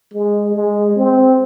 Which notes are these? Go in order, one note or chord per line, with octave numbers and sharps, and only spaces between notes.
G#3
G#3
C4